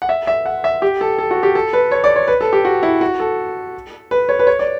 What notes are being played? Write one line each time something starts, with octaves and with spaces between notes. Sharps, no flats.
F#5
E5
E5
F#5
E5
G4
A4
A4
F#4
G4
A4
B4
C#5
D5
C#5
B4
A4
G4
F#4
E4
F#4
A4
B4
C#5
B4
C#5
D5